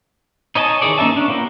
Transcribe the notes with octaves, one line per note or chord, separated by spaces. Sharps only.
D#4 C#5 D#5 G#5 A5
D#3 E3 G#4 C#5 D5
A#3 C#4 D#4 E5 A5
C#4 D4
A#3 B3 E4 G4 A#4